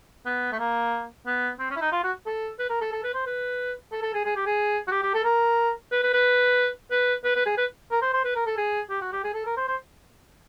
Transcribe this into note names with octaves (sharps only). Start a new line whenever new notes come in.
B3
A3
A#3
B3
C4
C#4
E4
D#4
F4
F#4
A4
B4
A#4
A4
A4
B4
C5
B4
A4
A4
G#4
G#4
G4
G#4
F#4
G4
G4
A4
A#4
B4
B4
B4
B4
B4
B4
G#4
B4
A#4
C5
C5
B4
A#4
A4
G#4
G4
F#4
G4
G#4
A4
A#4
C5
C5